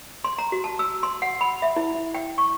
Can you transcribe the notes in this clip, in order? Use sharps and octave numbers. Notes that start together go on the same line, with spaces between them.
C6
A#5
F#4
A5
E6
C6
F#5
B5
E5
E4
G5
C#6